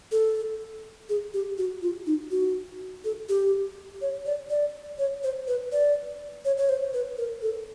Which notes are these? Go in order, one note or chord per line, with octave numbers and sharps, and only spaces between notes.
A4
G#4
G4
F#4
F4
D#4
F#4
A4
G4
C#5
D5
D5
C#5
C5
B4
D5
C#5
C#5
C5
B4
A#4
A4